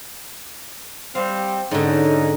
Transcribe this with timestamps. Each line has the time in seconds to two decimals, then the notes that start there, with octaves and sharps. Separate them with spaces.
1.15 G3 C4 F5
1.71 G#2 D3 C#4 D#4